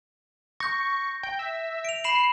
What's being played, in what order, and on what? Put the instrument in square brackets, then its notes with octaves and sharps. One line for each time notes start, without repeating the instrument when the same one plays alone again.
[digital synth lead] C#6 [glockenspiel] G6 A#6
[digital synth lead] G5
E5
[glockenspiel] D7 F7
[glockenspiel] B5 E7 F#7 [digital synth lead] C7